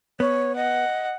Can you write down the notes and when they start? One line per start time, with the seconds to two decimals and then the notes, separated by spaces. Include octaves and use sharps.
0.20 B3 C#5
0.56 D#5 F#5